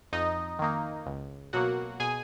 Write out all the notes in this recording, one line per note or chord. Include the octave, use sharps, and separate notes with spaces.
F2 D#4 D#5
D#3 A#3 D#4
C#2
B2 F#3 A#3 F#4 F#5
B2 G#4 G#5